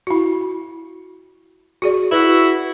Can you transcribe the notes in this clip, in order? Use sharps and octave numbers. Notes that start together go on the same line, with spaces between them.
E4 F#4
F#4 G#4 D5
E4 F#4 B4